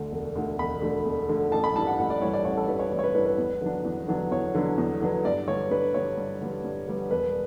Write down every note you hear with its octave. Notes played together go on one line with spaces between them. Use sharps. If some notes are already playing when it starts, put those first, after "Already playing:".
Already playing: D2 D3
E1
D2 D3
E1 B5
D2 D3
E1
D2 D3
A1 A5
B5
G2 E3 G3 A5
F#5
A1 F#5
D5
G2 E3 G3 C#5
D5
A1 C#5
A4
G2 E3 G3 B4
C#5
A1 D5
C#5
B4
G2 E3 G3 B4
B4
E2
D3 F#3 B3 D4
E2
D3 F#3 B3 D4
E2 C#5
D3 F#3 B3 D4
E2
D3 F#3 B3 D4
G2 D5
D3 G3 B3 C#5
G2 B4
D3 G3 B3 C#5
G2
D3 G3 B3
G2
D3 G3 B3
E1 B4